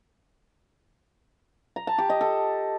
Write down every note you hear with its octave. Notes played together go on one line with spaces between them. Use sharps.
A#5
A5
G4
D#5
A4